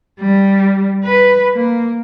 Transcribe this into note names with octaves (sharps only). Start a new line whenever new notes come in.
G3
B4
A#3